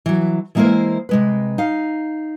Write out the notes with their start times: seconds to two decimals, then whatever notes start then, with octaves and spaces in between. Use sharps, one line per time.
0.06 E3 F#3
0.55 E3 G#3 A#3 E4 A#4 C5
1.09 C3 G#3 B4
1.58 D#4 F5